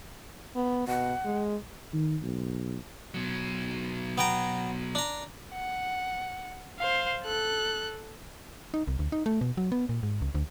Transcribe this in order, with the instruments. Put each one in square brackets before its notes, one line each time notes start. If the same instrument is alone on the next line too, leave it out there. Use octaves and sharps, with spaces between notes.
[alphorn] B3
[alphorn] B2 [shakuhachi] F#5
[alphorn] G#3
[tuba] D#3
B1
[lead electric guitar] B2 F#3
[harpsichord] B3 G5 A#5
D4 A#5
[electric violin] F#5
C5 F5
A4 F#6
[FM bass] D#4
C2
D2
D#4
A3
B2
F#3
B3
A#2
G#2
C#2
D2